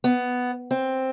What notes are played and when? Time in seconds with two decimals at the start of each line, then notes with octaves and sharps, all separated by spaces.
0.04 B3
0.71 C4